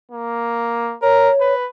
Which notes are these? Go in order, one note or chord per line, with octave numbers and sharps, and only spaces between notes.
A#3
A#4 C#5
B4